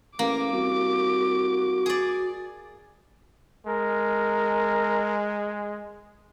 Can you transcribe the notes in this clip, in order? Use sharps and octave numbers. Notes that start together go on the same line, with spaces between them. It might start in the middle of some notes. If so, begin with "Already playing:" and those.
A1 A#3 D6
C2 F#4
G#4 D5
G#3 A#4